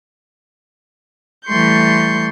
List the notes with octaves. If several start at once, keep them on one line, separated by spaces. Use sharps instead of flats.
E3 G3 A3 C6 C#6 G6